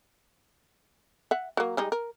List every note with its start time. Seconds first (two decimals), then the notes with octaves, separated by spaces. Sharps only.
1.31 E5 F#5
1.57 F#3 A#3
1.77 G3 G#3 D#4
1.92 A#4